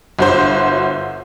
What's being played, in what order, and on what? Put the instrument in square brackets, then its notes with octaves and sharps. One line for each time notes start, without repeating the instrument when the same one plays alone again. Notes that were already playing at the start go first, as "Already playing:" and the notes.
[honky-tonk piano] G1 F#4 C5